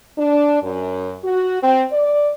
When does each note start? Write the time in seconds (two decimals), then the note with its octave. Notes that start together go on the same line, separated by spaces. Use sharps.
0.18 D4
0.63 F#2
1.24 F#4
1.62 C4
1.92 D5